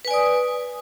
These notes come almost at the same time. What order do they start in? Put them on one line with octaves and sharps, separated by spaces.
B4 G#5 D5 D#6